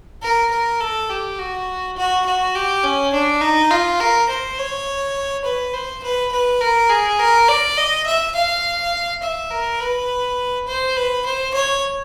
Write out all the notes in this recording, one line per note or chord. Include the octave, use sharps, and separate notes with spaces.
A#4
A#4
A4
G4
F#4
F#4
F#4
G4
C#4
D4
D#4
F4
A#4
C5
C#5
B4
C5
B4
B4
A#4
G#4
A#4
D5
D#5
E5
F5
E5
A#4
B4
C5
B4
C5
C#5